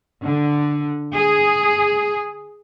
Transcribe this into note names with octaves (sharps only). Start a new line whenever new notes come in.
D3
G#4